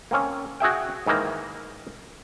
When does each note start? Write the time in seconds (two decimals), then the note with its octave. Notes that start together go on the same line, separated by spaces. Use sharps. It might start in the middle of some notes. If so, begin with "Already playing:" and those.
0.11 A#3 C4 C#4
0.60 F#4 G#4 E5 G5
1.06 G#2 D#3 E3 A#3 A#5